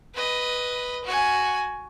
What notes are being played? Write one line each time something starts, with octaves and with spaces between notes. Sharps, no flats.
B4 D#5
F#4 G#5